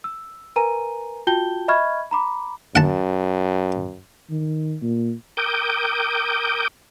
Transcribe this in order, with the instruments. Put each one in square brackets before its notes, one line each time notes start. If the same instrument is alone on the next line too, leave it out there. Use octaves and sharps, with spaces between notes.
[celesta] E6
A#4 B4 G#5 A#5 D#7
F4 F#4 G5 A5 G6 G7
D#5 E5 B5 C#6 F6 G#6
A#5 B5 D6
[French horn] F#2 [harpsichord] F#5 A5
[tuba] D#3
A#2
[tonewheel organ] A#4 G5 D6 D#6 G6